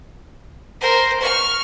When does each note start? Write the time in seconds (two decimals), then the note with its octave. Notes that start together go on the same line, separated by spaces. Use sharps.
0.81 A#4 C5
1.20 C#6 F6